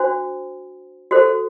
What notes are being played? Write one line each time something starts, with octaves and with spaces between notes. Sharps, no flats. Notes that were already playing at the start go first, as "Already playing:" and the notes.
Already playing: D4 F#4 C5
F#4 A4 C5